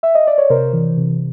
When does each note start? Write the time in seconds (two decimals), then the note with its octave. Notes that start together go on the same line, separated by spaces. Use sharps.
0.03 E5
0.15 D#5
0.27 D5
0.38 C#5
0.50 C3 A#4 C5
0.73 E3
0.97 C3